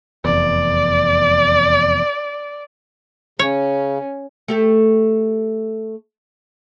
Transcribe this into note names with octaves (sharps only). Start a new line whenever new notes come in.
F1 E2 D5
C#3 C#4 C#5
A3 G4 A4